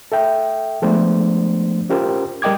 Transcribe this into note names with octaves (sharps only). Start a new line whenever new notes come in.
A4 E5 G5
F3 G#3 A3 B3 D4 C5
C#4 F4 G4 A#4 C5
G3 A#4 D#5 G5 D6 G#6